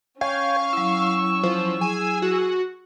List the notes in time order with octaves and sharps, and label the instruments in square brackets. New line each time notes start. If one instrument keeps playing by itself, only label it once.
[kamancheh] C#4 C#6 [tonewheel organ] C#5 G5 G#5 [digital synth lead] F5
[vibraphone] F#3 E4 [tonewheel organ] E6
[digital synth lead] F3
[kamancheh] G#4 [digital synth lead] G#5
[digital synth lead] F#4